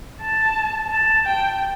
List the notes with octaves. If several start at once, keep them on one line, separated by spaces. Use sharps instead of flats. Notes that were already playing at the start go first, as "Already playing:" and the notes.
A5
A5
G5